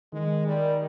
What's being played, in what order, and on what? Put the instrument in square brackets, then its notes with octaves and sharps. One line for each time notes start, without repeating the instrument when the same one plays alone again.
[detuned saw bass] D#3 [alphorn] G#3
[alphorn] G3